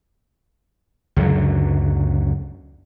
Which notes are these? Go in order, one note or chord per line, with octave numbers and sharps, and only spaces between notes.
C#2 F#2 D3 F#3